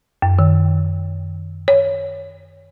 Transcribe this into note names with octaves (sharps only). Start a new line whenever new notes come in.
F#2
D#3
C#5